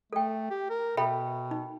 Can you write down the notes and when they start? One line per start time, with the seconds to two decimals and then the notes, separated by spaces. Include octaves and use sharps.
0.13 A3 A4 G5
0.51 G4
0.70 A#4
0.97 B2 A4 E5 G5 B5
1.51 D#4